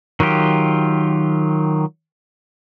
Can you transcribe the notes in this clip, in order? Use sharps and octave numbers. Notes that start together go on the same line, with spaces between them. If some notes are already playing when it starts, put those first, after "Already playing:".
D#3 F#3 F4 G4